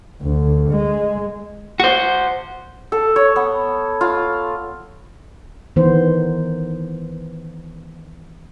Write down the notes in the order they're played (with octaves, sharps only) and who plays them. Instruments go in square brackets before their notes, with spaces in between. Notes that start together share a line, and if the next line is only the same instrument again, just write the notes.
[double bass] D2
G#3
[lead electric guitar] F#4 C5
[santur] A4
C#5
B3
F4
[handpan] D#3 E3 B3 C5